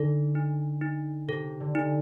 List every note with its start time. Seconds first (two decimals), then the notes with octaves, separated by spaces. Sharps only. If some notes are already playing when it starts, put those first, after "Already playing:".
Already playing: D3 D#4 A4
0.35 D#4
0.82 D#4
1.28 C3 A4
1.60 D3
1.75 D#4